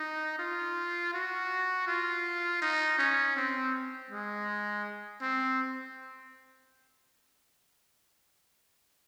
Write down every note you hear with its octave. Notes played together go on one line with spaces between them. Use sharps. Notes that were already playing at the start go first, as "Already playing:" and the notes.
Already playing: D#4
F4
F#4
F4
D#4
C#4
C4
G#3
C4